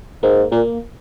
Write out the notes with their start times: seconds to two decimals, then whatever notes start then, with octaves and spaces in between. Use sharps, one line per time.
0.23 G#2 A#3
0.52 A#2 A#3